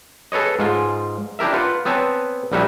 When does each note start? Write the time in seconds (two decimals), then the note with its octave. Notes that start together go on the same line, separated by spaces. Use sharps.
0.32 G#4 A4 B4 C#5 D#5
0.59 G#2 G#3 F4
1.39 D4 E4 G4 A#4 E5
1.53 F4 B4 F#5
1.85 B3 C4 B4 C#5 G#5 A5
2.52 A#1 G3 D#4 F#4 E5 G#5